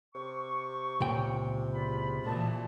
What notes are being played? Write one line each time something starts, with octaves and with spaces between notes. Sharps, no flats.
C3 C#6
C#2 A#2 G5
E2 F4 B5
F2 A#2 E3 F3 F#4 A5